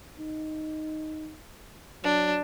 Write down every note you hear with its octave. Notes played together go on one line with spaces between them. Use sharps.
D#4
F#3 D4